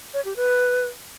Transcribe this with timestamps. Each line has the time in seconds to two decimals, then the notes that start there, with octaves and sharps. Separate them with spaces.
0.14 C#5
0.25 G4
0.36 B4